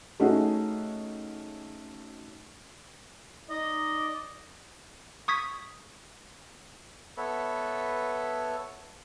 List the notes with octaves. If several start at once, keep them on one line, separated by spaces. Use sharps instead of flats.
A3 C#4 D#4 F#4 G#4
D#4 D5 D#5
C#6 D#6 G#6 B6
B3 A4 B4 C#5 E5